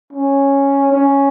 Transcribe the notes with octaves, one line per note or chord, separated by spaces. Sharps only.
C#4
C#4